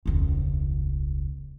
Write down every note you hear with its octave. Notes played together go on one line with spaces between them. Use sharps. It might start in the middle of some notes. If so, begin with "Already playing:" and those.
E1 C#2